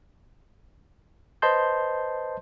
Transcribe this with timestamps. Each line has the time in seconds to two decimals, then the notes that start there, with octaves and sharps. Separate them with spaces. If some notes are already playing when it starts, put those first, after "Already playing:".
1.42 B4 C5 D#5 A5 C6 G6